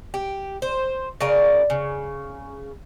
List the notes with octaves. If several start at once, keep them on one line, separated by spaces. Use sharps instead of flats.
G4
C5
C#3 F4 A#4 D5
C#3